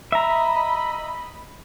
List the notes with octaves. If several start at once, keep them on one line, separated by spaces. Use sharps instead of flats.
D#5 E5 A#5 B5